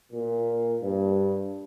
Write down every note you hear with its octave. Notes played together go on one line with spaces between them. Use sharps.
A#2
G2